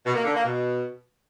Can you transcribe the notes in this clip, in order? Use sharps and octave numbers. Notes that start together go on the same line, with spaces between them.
B2
A#3
D3
A#3
B2